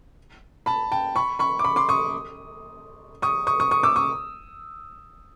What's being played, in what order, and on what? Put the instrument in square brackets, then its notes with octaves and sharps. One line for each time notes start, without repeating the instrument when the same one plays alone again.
[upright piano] A5 B5
G5 A5
B5 C#6
B5 C#6
D6
B5 C#6
C6 D6
C#6 D#6
C#6 D#6
C#6 D#6
C#6 D#6
C#6 D#6
D6 E6
C#6 D#6